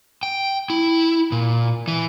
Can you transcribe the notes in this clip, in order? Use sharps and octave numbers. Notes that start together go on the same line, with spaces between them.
G5
E4
A#2
E3